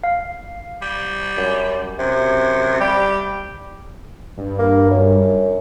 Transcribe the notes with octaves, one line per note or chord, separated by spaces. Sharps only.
F5
G3
F#2
F#2 C3
G3 G4
G2
A#3
F#2